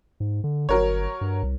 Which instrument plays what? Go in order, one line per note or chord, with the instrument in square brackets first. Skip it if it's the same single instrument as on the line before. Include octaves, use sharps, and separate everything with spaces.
[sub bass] G#2
D3
[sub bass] G1 [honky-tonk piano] F#3 A#4 C#5
[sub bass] G2
C2